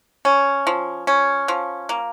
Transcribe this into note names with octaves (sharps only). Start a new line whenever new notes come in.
C#4
F3
C#4
F3
A#3